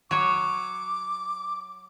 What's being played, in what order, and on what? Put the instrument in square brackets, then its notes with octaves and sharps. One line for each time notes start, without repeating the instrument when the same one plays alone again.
[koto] F#3 C#5 [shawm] D6